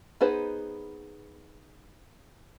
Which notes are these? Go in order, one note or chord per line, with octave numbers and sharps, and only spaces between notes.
B3 D#4 G#4 B4 C5